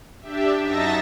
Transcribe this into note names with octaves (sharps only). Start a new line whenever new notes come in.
D4 G4 E5
F#2 D#4 E5 A5 A6 A#6